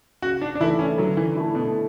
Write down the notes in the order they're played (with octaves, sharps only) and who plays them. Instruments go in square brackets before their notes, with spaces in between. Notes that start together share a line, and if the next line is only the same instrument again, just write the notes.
[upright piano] C#3 [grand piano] F#4
[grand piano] D4
D4
[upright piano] E3 A3 [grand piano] E4
[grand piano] C#4
[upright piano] D3 [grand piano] F#3
[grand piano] E3
[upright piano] A3 E4
[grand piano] B2